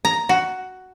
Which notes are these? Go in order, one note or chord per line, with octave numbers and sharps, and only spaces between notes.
A#5
F#4